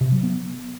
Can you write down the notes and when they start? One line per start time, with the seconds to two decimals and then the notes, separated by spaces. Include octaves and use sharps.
0.01 C3
0.12 F#3
0.23 B3